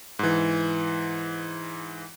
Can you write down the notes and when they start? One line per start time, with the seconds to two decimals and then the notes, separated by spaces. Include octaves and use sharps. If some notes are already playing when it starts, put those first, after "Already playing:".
0.19 G#2 E3